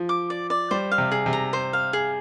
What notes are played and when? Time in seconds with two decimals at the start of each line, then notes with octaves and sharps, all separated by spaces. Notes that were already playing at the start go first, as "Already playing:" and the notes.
Already playing: F3
0.09 D6
0.30 D5
0.50 D5
0.71 G3 C5
0.91 F5
0.98 C3
1.11 G#4
1.26 C3
1.33 A#5
1.53 C5
1.73 F5
1.93 G#4